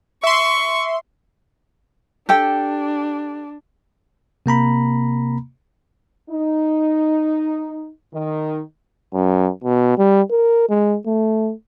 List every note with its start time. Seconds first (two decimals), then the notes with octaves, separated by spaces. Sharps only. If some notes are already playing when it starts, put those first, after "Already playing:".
0.23 E5 C6 C#6
2.29 D4 G4 A4 G5
4.46 C3 A#3 A#5 B5
6.30 D#4
8.13 D#3
9.13 F#2
9.64 B2
9.98 G3
10.31 A#4
10.69 G#3
11.06 A3